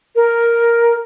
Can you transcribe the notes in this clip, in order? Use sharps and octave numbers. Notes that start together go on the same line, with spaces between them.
A#4